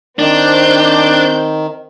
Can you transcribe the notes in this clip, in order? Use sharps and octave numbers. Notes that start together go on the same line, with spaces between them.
D#3 C4 D4 G6